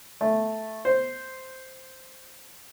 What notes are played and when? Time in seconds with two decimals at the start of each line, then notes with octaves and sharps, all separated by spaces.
0.21 A3
0.85 C5